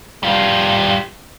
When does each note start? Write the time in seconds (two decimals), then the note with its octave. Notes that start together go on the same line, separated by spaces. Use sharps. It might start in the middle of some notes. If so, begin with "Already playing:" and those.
0.23 G3 F4